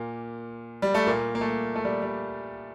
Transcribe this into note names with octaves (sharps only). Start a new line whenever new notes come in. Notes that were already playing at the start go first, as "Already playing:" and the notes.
Already playing: A#2 A#3
G3
A3
A#2 A#3
A#3
A3
A3
G3
G3